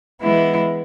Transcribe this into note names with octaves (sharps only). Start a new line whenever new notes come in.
E3 G#3 B3 E4